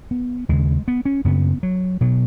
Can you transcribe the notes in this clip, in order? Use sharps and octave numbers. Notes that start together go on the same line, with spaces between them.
B3
D#2 C#3 G#3
B3
C#4
F#2 C#3 B3
F#3
B2 F#3